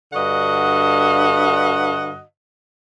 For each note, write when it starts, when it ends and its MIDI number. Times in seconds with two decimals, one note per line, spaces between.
0.13 2.21 43
0.13 2.21 50
0.13 2.21 66
0.13 2.21 75
0.13 2.21 78